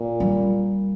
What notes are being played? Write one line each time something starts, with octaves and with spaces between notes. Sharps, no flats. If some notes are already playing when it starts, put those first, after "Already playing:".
Already playing: A#2
G3